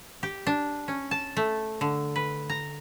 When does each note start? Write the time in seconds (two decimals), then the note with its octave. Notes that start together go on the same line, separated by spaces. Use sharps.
0.23 G4
0.47 D4
0.88 C#4
1.11 A5
1.37 A3
1.81 D3
2.16 B4
2.49 A#5